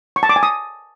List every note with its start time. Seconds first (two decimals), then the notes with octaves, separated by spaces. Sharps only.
0.16 C#6
0.23 A5
0.29 D6
0.36 G#5
0.43 D#6